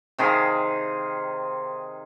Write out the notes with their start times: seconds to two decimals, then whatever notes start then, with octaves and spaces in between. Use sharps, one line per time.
0.18 C3 D#3 G#4 F5